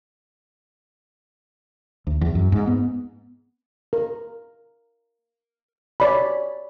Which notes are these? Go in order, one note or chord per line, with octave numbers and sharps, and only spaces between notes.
D2
E2
F#2
G#2
B3
A#4
C#5 D5 B5